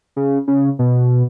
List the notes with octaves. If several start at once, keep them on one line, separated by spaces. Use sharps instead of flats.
C#3
C#3
B2